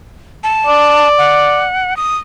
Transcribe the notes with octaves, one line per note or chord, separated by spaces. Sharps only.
A5
D5
F#5
D#6